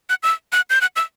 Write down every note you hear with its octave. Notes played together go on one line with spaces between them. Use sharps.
F#6
E6
F#6
G6
F#6
E6